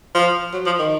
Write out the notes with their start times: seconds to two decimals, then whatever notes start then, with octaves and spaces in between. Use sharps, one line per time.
0.15 F3
0.53 F#3
0.66 F3
0.79 D#3